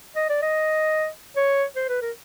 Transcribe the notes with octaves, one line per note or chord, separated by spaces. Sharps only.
D#5
D5
D#5
C#5
C5
B4
A#4